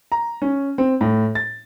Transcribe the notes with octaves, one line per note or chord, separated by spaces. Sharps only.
A#5
C#4
C4
A2
A6